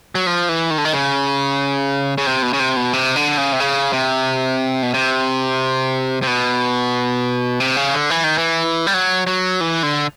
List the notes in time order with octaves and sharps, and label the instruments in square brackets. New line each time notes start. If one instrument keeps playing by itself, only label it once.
[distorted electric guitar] F#3
F3
E3
D#3
D3
D#3
C#3
C#3
C3
B2
C#3
C3
B2
C3
D3
C#3
C3
C#3
C3
B2
C3
C3
B2
C3
C#3
D3
E3
D#3
E3
G3
F#3
F#3
E3
D3